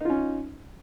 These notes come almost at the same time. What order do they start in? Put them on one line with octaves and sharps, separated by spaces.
D#4 F4 C#4